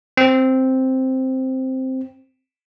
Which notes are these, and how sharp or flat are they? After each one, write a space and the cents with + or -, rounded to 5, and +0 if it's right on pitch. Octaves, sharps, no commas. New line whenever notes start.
C4 +0